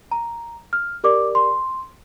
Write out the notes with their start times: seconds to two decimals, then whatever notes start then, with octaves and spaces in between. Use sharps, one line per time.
0.11 A#5
0.73 F6
1.04 G4 A#4 D5 D6
1.35 C6